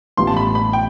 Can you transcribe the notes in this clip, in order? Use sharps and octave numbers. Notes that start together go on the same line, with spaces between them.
A1 A2 G3 B3 F4 C6
A5
B5
B5
G5